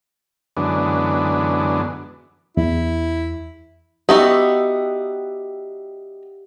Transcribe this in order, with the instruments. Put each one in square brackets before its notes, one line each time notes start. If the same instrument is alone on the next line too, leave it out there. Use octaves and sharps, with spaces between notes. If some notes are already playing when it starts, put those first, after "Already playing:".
[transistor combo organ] F#2 D3 E3 G#3 B3 D4
[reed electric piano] E2 [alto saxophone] E4
[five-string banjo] B3 D#4 F#4 [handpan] G4 E5